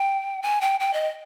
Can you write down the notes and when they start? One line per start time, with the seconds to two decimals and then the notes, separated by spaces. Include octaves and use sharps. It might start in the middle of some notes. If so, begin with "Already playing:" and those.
Already playing: G5
0.43 G#5
0.61 G5
0.80 G5
0.93 D#5